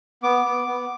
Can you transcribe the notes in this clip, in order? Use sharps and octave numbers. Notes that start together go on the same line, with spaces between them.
B3 D6
B3
B3